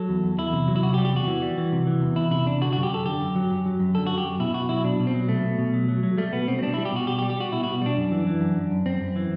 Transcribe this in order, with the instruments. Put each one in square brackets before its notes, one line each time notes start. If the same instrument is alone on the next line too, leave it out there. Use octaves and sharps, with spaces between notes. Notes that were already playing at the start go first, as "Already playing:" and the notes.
Already playing: [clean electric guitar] F#3 A4
E2
E2
E2 E4
C3
F#3
E4
C3 F#4
G4
G3
G4
E2 F#4
E3
G3
E3
C3
E3
E2
E2 E4
C3 E4
C3 D4
D3 F#4
F#2 F#4
G4
F#2 A4
D3 G4
F#2
F#3
F#2
F#3
F#2
D3 A4
F#2 F#4
G4
F#2
B2 E4
B2 F#4
F#3 E4
B2 D4
B2
C4
F#3
B2 A3
B2
B2
F#3
F#3
F#3
G3 A3
B2 B3
B2 C4
C4
G3 D4
G3 E4
G4
B2 F#4
B2 G4
G4
G3
G4
G3 F#4
B2 E4
B2 F#4
G3 D4
F#2
E3
E3
F#2
F#2
F#2
F#2 C4
F#2
E3